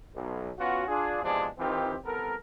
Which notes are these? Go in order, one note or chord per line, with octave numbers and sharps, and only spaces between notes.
B1
B3 C#4 F4 F#4
D4 F4 G#4
E2 C3 F3 G#3 D4 G#4
D#3 E3 C4 D#4 F4 G4
C2 B3 A4 A#4